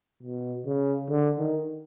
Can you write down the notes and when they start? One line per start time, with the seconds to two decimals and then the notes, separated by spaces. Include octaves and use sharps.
0.23 B2
0.66 C#3
1.10 D3
1.38 D#3